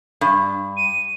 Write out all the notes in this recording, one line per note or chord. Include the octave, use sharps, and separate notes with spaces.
G2
D#7